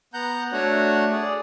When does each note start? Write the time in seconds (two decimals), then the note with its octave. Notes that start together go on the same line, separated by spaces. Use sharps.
0.14 B3 F#5 A#5 G6
0.52 A3 D4 F#4 C#5 F#5
1.12 G#4 D5